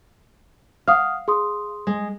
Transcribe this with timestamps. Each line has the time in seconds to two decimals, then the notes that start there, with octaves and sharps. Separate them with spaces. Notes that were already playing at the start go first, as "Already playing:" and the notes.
0.88 F5 F#5 D#6 F6
1.28 G#4 C6 D#6
1.87 G#3